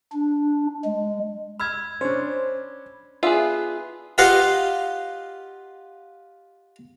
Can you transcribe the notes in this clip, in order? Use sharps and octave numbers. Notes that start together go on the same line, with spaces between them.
D4
G#3
B5 E6 F6 G#6
C#4 D4 C5
B3 D4 F4 G#4 E5
F4 G4 B4 D#5 F5 F#5